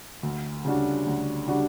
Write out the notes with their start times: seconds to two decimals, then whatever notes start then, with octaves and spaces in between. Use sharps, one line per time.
0.23 D2
0.65 C#3 G3 D4 F#4
1.06 D2
1.48 C#3 G3 D4 F#4